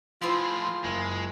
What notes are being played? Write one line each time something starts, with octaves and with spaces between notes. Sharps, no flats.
A2 F3 E4 F4 G#4 C5
F#1 G#3